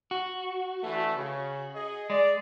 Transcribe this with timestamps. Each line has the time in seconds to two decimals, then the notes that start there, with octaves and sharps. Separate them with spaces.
0.11 F#4
0.83 D3 E3 A3
1.15 C#3
1.74 G#4 D#5
2.10 G#3 D5